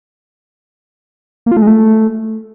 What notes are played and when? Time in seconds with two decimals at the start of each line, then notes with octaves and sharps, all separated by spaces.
1.46 A#3
1.52 F4
1.57 A3
1.62 G#3
1.67 A3